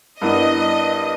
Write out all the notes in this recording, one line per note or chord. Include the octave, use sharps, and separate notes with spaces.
G2 G3 B3 E4 A#4 D#5